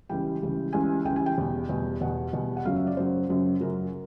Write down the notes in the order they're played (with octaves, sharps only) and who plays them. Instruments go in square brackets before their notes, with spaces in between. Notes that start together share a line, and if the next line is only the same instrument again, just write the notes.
[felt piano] C#2 C#3 E3 G3 G5
C#2 C#3 E3 G3
C#2 C#3 E3 G3 G#5
C#2 C#3 E3 G3 G5
G#5
G5
E2 B2 G3
E2 B2 G3
E2 B2 G3 F#5
E2 B2 G3
F#5
F#2 C#3 F#3 F5
E5
D5
F#2 C#3 F#3 C5
F#2 C#3 F#3
F#2 C#3 F#3 A#4